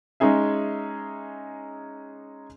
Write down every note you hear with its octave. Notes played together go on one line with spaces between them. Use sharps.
G#3 C#4 D#4 G#4 E5